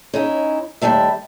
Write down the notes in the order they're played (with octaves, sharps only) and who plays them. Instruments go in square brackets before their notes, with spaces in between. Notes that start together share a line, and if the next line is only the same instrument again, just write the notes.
[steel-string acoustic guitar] C#4 D#4 E4
D#2 C3 G3 A3 E5